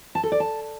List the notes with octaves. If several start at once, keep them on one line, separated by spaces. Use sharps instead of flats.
A5
A4
D5
A5